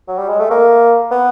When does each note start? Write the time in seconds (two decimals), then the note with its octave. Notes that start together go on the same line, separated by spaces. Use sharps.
0.08 F#3
0.18 G3
0.29 G#3
0.40 A3
0.51 A#3
1.11 B3